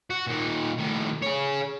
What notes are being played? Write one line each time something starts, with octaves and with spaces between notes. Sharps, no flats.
F#4
A#2 D#3
A2 D#3
G#4 C#5